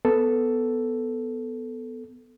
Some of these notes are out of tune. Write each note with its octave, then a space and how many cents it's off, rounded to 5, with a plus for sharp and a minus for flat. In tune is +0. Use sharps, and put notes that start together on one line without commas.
B3 +10 A4 +0